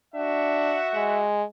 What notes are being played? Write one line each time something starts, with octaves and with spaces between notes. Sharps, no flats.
D4 F#4 E5 F#5
G#3